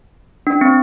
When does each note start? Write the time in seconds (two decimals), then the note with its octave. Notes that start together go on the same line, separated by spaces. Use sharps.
0.47 D4
0.61 C4